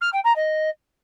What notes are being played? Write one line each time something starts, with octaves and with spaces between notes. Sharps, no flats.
F6
G5
A#5
D#5